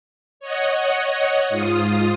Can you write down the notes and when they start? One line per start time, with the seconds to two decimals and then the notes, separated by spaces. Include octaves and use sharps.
0.40 C#5 D#5 F#5
1.49 G#2 F4 D#6